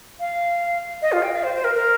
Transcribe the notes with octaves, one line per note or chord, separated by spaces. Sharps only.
F5
D#5
F4
G5
F5
C5
C5
A#4
A#4